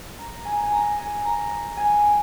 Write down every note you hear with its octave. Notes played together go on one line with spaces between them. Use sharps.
A#5
G#5
A#5
G#5
A#5
G#5
A#5
G#5
G5